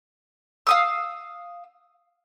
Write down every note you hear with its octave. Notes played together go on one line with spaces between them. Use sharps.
F5 D#6 E6